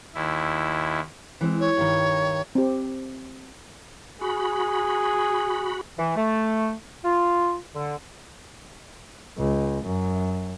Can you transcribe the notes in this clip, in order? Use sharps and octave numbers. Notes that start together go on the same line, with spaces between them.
D#2 E4
E3 G#3 C4
C#5
G2 D#3
C4 G4
F#4 G#4 B5
E3
A3
F4
D3
C#2
F#2